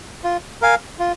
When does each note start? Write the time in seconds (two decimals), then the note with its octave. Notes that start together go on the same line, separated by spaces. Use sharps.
0.24 F4
0.62 A#4 F5 G#5
0.99 F4